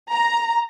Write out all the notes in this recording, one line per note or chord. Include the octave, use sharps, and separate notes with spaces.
A#5